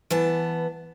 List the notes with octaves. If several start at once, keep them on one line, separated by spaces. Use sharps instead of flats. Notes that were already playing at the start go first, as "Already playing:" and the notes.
E3 B3 A5